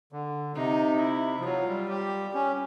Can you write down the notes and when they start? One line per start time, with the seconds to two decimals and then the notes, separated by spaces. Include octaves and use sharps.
0.12 D3
0.56 C3 D#4
1.01 E4
1.40 F3
1.45 F#3 F4
1.67 G3
1.89 G4
2.34 C#4 G4